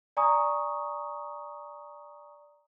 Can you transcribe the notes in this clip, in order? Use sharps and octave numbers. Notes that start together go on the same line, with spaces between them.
D5 G#5 A#5 C#6 D#6